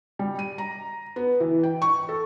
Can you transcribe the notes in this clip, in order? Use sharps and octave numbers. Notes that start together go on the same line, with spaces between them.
G3
D#7
A#5
B3
E3
G5
C#6
A4